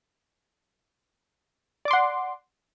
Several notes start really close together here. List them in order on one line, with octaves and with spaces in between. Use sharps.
D5 D6 C6 F#5